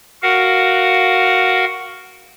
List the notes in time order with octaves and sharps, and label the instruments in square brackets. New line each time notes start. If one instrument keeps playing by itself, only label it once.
[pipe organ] F#4 A#4 F5 F#5